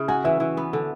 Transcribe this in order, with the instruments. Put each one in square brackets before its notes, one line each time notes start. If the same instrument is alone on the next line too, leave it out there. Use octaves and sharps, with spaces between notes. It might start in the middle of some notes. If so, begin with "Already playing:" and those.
Already playing: [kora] C#3 E4
[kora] F#4 [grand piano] G#5
[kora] E3 [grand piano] E5
[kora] E3
B3
D3